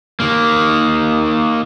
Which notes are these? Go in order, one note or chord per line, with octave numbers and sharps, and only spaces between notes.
D#3 A#3